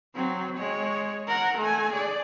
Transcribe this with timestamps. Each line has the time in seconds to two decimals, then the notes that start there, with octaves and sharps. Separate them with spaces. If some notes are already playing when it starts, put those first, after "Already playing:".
0.16 F#3 C4
0.57 G#3 C#5
1.28 A#4 F#5
1.58 A3 G#5
1.93 G#4 D5